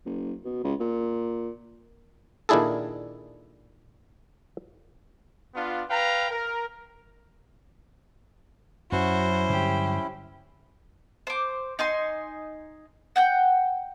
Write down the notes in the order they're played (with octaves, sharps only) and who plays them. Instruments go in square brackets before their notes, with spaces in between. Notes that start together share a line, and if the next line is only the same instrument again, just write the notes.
[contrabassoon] F#1
B2
C#2
A#2
[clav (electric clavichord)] A#2 D#3 D4 E4 G#4 A4
[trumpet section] B3 D4 F4
B4 F5 G5 A#5
A#4
[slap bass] F#2 F#3 [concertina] C#4 E4 [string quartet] F#4 [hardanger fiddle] C5
[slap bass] G2 D3 F#3 [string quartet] G4
[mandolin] C5 D6
D#4 G#5 C6
F#5 G5 G6